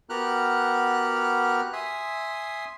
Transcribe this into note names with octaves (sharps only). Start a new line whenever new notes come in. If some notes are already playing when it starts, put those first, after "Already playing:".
B3 F#4 G4 A#4 F6 F#6
E5 G#5 C6 D#6